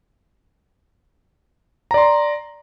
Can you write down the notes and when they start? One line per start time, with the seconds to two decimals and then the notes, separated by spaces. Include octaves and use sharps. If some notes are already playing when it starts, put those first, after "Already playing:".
1.91 A#5
1.94 D5
1.98 C6